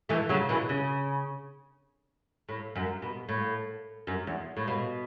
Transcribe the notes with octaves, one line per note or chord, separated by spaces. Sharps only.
E3 A3
C#3 F#3
B2 E3
C#3
A2
F#2
B2
A2
F#2
E2
A2
B2